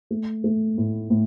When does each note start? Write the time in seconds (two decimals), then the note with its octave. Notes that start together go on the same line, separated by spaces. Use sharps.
0.11 A3
0.44 A3
0.78 A2
1.10 A2